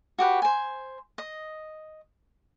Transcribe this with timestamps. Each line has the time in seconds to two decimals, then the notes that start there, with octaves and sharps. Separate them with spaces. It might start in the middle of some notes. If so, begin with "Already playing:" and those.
0.18 F#4 G4 B4
0.42 C5 G#5
1.18 D#5